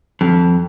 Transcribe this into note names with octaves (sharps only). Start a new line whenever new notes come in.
F2